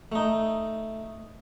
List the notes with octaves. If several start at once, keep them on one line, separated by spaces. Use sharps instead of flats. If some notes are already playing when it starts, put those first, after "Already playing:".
A3 D#4